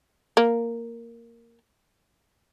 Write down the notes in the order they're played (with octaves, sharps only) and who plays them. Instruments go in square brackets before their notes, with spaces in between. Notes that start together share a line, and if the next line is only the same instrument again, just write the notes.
[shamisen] A#3